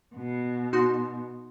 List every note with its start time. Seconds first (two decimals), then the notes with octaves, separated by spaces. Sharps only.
0.15 B2
0.73 D#4 F#4 C6